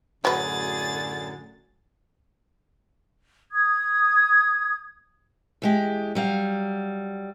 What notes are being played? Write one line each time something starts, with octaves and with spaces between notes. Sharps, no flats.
F#2 A2 D3 F#3 G#4 B4 A6
D#6 G#6
E2 G#3 G4
F#3 G3 F5